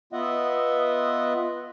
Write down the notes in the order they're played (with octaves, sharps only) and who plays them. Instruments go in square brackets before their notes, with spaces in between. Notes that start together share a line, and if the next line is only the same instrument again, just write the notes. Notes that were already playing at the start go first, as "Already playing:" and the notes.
[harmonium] B3 F4 D#5 E5 F#5